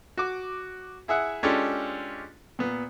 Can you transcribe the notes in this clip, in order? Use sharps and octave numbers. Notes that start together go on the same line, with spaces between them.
F#4 D6
E4 G#4 E5 F#5
G#3 C#4 D4 F4 G4 A4
A#2 B3